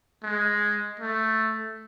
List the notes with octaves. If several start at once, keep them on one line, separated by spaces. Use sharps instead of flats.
G#3
A3